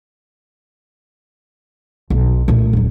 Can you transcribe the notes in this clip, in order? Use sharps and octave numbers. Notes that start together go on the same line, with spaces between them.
B1
A#2 A3
D#1 F#3